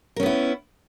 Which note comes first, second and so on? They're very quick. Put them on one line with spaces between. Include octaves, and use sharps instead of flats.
A#4 C#4 B3 E4